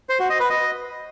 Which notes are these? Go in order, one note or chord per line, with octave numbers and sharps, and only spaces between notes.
C5
F#4
D#5
B4
D#5